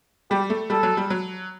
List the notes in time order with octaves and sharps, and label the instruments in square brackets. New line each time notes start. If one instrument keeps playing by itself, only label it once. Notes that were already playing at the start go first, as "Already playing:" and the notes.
[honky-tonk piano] G3 [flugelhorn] G4
[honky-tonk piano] A3
[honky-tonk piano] G3 [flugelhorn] A4
[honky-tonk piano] F#3
G3
F#3